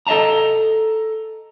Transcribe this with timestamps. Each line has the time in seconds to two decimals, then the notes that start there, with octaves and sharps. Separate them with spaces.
0.07 A4 D#5 E5 A5 A#5